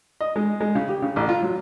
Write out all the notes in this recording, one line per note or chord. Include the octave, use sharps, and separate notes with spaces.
D#5
G#3
G#3
C#3
G4
C#3
A1
F4
F#3